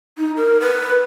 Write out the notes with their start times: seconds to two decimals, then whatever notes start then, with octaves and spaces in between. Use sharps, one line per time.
0.18 D#4
0.37 A#4
0.60 B4